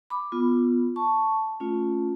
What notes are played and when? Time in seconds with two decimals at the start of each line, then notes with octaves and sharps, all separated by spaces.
0.10 B5 D6
0.32 B3 F4
0.96 A5 C#6
1.60 A3 C#4 F4